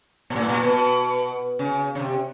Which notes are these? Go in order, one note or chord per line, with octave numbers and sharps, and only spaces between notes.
A#2
A2
A#2
B2
C#3
C#3
C3